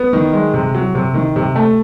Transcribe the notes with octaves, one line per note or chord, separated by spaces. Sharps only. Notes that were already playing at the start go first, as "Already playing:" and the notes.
Already playing: B3
D#3
G#3
C3
F#3
C3
D#3
C3
A3